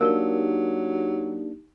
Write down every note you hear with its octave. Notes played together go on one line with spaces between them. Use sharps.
F#3 A#3 D4 D#4 G4 A#4